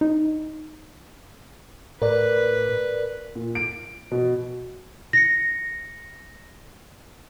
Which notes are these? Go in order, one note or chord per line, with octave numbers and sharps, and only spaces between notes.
D#4
A2 A#4 B4 D5
A#2
D7
B2
A#6 C#7